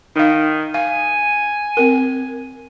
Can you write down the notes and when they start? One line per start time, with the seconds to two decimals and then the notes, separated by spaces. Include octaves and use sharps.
0.16 D#3 D#4 F5
0.74 F5 G#5
1.77 C4 A#4